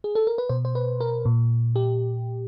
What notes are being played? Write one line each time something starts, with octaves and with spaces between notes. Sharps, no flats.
G#4
A4
A#4
B4
B2 C5
C5
B4
A#4
A#2
G4